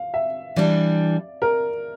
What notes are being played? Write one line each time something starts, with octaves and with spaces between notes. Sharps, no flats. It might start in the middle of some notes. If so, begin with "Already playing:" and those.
Already playing: F5
E5
E3 G3 D4 D5
A#4